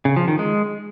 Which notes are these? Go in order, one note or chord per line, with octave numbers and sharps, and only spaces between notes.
C#3
F3
D#3
G#3